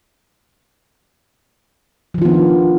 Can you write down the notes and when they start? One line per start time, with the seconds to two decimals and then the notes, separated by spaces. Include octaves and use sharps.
2.14 F3
2.18 D#3
2.22 F4
2.25 B3
2.29 D4